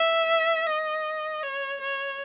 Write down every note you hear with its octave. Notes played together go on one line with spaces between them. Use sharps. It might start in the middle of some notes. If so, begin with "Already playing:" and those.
Already playing: E5
D#5
C#5
C#5